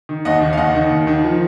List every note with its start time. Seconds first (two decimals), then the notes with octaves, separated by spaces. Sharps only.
0.09 D#3
0.25 D#2 D#5 F#5
0.41 D#3
0.53 F5
0.57 D#2 D#5 F#5
0.75 D#3
0.90 D#2
1.07 D#3
1.24 F3